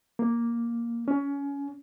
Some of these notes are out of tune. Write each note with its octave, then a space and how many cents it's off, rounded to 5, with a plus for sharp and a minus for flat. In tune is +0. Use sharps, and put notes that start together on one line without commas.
A#3 +5
C#4 +25